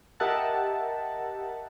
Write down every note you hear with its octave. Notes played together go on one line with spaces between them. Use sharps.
G4 A#4 D#5 E5 F#5 A5